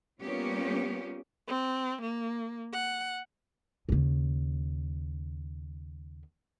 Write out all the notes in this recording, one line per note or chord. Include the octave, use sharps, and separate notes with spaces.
G3 A#3 B3 C#4 F4 G4
C4
A#3
F#5
D#2 C#3